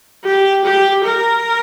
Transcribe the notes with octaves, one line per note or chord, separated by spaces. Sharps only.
G4
G4
A#4